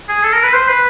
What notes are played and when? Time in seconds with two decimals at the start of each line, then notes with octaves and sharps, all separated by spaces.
0.09 G#4
0.23 A4
0.33 A#4
0.43 B4
0.53 C5
0.69 B4